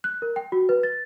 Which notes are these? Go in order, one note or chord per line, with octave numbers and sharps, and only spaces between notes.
F#6
A#4
G5
F#4
B4
A6